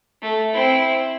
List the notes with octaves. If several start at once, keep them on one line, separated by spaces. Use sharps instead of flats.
A3
C4 E4